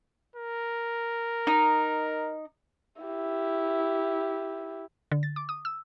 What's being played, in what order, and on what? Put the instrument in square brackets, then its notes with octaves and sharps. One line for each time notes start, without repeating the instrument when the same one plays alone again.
[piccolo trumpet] A#4
[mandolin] D#4
[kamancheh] E4 G4
[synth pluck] D3
A6
D6
D#6
E6